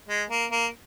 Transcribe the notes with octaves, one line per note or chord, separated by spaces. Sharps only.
G#3
A#3
A#3